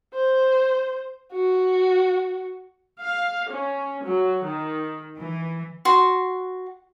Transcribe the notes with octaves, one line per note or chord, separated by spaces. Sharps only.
C5
F#4
F5
C#4
F#3
D#3
E3
F#4 C6